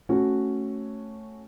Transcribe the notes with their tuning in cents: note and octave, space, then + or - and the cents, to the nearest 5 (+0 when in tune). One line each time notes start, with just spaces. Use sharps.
A3 +0 C#4 -10 F#4 +0